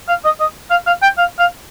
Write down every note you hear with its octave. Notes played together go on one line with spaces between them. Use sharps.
F5
D#5
D#5
F5
F5
G5
F5
F5